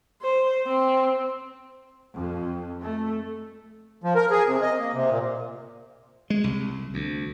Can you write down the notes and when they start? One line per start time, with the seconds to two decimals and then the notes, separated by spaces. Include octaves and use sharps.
0.22 C5
0.67 C4
2.12 F2
2.81 A3
4.04 F3
4.15 A#4
4.31 G#4
4.47 C3
4.62 D#5
4.79 A#3
4.93 C3
5.10 A#2
6.30 G#3
6.44 C2
6.94 D2